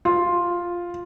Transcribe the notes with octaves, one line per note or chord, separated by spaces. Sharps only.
F4